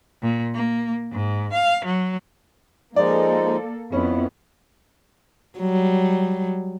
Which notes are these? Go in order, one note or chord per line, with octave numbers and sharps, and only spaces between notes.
A#2
A#3
G#2
F5
F#3
F3 G#3 A#3 D#4 A4 D5
F2 B3 C#4 E4
F#3 G3